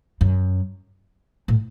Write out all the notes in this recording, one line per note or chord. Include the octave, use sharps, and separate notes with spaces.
F#2
A2